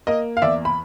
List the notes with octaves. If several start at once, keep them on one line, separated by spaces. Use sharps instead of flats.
A#3 D#5
F5
E2 D5 E5
B5